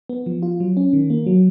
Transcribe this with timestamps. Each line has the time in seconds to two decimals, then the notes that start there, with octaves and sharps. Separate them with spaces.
0.09 B3
0.26 F3
0.43 F4
0.60 F#3
0.77 C#4
0.93 D#3
1.10 A#3
1.26 F#3